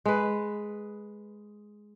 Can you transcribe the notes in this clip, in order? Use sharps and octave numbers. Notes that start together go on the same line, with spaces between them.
G#3 B4